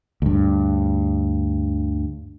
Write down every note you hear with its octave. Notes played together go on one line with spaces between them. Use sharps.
D2 G2